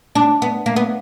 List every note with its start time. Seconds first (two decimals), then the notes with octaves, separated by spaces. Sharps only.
0.15 D4
0.42 B3
0.66 A#3
0.76 B3